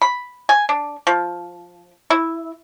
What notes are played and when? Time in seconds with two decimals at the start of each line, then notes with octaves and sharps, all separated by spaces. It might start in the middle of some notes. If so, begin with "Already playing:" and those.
0.02 B5
0.49 G#5
0.69 D4
1.07 F3
2.10 E4